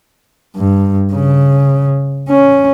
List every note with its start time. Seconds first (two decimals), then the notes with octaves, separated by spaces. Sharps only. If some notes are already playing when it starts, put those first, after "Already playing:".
0.57 G2
1.13 C#3
2.29 C#4